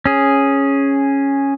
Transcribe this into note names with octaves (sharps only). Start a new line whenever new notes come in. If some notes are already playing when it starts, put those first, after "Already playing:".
C#4 G#4